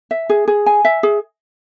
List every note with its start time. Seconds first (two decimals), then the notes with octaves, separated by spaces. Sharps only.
0.11 E5
0.30 G#4
0.48 G#4
0.66 G#5
0.85 E5
1.03 G#4